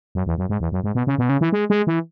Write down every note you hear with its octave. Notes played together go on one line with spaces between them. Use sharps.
F#2
E2
F#2
G#2
E2
F#2
G#2
B2
C#3
B2
C#3
E3
G#3
G#3
E3